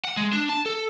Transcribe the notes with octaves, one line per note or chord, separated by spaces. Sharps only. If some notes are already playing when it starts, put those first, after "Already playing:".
F#5
G#3
D4
A5
A4